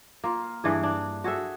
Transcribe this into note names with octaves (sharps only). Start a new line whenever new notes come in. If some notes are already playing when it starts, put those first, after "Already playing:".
A#3 F4
G2 E3 D4 G#4
D4
F#4 G#4 A4 E5